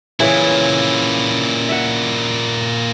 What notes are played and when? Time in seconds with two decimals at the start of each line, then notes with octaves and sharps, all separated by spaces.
0.20 A#2 C#3 E3 E4
1.69 E5 F#5